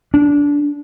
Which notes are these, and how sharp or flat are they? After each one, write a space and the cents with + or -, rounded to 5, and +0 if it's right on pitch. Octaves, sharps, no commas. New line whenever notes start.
D4 -20